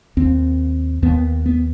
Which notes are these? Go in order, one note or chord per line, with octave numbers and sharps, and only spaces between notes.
D#2 C4
D#2 B3
B3